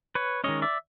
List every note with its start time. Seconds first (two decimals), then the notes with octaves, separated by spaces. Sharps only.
0.15 B4 C#5
0.44 D#3 G#3 C#4 C#5 D#5
0.62 D5 E5